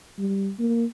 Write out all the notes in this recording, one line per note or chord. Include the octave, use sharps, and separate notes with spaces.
G3
A#3